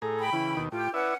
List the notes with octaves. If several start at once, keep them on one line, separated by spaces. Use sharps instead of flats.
A2 G#4 A4 A#5
G5 B5
C#3 E3 E4
D#2 B2 D#3
A2 F4 G4 G5
C#4 E4 B4 D5 E5 F#5